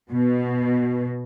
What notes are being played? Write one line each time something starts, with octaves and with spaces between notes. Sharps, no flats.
B2